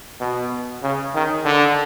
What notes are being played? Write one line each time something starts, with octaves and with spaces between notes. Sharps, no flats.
B2
C#3
D#3
D3